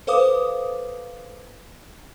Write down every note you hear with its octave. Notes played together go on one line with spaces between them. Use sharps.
A4 B4 C5 F5 D6 D#6